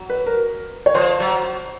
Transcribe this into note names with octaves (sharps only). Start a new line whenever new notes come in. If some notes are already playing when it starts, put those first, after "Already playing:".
Already playing: F#3
B4
A#4
C#5
F3 C5
F#3